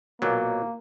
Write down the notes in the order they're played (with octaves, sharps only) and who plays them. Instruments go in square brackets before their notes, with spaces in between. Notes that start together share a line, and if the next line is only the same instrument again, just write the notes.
[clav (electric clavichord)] B1 A#2 F#3 [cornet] A#3